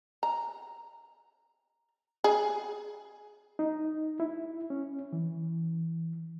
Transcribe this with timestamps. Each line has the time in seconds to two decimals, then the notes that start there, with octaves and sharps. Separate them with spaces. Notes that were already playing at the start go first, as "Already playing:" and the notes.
0.23 A#5
2.24 G#4
3.59 D#4
4.20 E4
4.70 C#4
5.13 E3